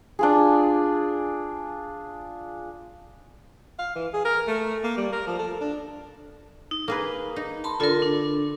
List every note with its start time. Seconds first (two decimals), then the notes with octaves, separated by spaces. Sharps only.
0.19 D4 F4 G#4
3.79 F5
3.95 E3
4.13 G#4
4.25 A#4
4.47 A3
4.84 A#3
4.97 G3
5.12 A#4
5.27 F3
5.39 A4
5.61 D4
6.71 D#4
6.88 A#3 G#4 B4
7.36 D#4
7.64 A5 B5 C6
7.80 D3 F4 A4 A#4
8.02 D4